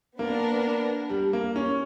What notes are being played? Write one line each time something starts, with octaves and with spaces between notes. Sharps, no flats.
A#3 B3 D4 A#4
G3
A#3
C#4